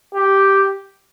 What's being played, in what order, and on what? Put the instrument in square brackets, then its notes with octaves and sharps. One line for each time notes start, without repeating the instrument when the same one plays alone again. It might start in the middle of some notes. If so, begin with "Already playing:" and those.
[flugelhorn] G4